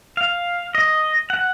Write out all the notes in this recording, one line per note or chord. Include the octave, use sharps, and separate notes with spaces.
F5
D#5
F#5